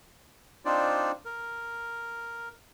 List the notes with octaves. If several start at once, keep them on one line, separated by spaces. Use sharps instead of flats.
C4 D4 D#4 F4 C5 D5
A#4